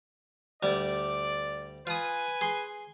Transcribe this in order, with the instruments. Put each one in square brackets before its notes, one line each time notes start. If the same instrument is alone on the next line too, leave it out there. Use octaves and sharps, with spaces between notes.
[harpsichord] D2 G3 [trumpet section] D5
[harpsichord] F4 D#6 [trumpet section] B4 G#5
[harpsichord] G#4 C6